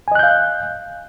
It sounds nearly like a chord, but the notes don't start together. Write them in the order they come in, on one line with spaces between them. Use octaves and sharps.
G#5 D#5 F#6 G6 F5